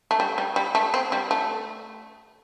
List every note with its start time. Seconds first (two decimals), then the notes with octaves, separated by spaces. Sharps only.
0.11 A3
0.20 G3
0.38 G3
0.56 G3
0.75 A3
0.94 C4
1.12 G3
1.31 A3